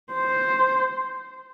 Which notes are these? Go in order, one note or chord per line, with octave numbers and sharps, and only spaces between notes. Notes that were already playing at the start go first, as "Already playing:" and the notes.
C5